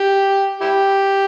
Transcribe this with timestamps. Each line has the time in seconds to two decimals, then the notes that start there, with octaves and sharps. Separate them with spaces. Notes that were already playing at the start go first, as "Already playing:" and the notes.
Already playing: G4
0.61 E4 G4